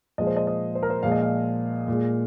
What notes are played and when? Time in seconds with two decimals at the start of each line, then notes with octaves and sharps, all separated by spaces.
0.18 A#2 F3 G#3 D#5
0.27 C5
0.37 D#5
0.47 D#5
0.75 C5
0.83 A#4
0.90 C5
1.03 A#2 F3 G#3 F5
1.12 D#5
1.22 F5
1.88 A#2 G#3